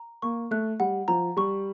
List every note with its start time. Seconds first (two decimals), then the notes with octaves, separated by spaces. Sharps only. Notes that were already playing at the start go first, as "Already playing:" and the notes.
Already playing: A#5
0.22 A#3 C#6
0.51 A3 F#6
0.80 G3 F#5
1.08 F3 A#5
1.37 G3 C#6